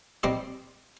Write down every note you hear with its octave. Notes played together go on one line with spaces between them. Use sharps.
G3 C4 G4 C5 D#5